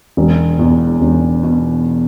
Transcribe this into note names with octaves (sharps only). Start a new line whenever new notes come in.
E1
E2
E1
B2